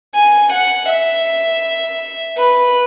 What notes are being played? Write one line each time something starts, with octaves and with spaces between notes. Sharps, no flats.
G#5
F#5
E5
B4